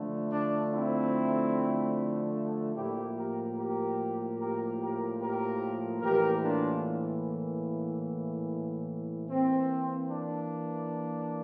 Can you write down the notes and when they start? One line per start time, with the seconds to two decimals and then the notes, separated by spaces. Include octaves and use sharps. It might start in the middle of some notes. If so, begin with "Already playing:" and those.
Already playing: D3 F3 A3
0.30 D4
0.71 C4 E4
2.75 A2 F3 A#3 E4 G4
3.16 G4 A#4
3.57 G4 A#4
4.39 G4 A#4
4.80 G4 A#4
5.20 G4 A#4
6.02 A2 E3 A#3 G4 A#4
6.43 D4 F4
9.29 E3 A#3 C4
10.11 D4